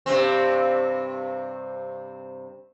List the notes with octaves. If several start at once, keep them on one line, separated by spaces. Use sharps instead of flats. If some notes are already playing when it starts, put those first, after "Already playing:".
G2 C3 C4